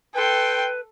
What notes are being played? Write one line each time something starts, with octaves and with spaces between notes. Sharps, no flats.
A4 B4 G5 C6